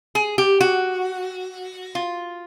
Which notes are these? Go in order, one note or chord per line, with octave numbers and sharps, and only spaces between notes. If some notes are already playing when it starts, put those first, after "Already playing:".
G#4
G4
F#4
F4